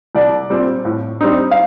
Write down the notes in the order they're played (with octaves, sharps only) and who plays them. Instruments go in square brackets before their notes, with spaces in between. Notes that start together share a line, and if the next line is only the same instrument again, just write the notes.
[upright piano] C2 D5
A#2 G3 C4
A2
G3 C4 D#4
F5